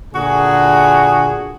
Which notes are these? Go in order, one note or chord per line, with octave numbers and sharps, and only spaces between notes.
A#2 D3 F#4 G#4